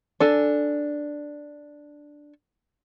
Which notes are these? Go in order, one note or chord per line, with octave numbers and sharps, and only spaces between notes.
D4 A4 G#5